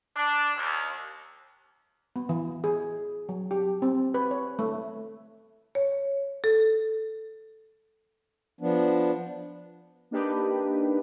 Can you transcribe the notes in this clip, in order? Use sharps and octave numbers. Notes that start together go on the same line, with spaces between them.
D4
D#2
B3
E3
G#4
F#3
G4
C4
B4
C#5
A3
C#5
A4
F3 B3 D4
A#3 D4 D#4 G4 B4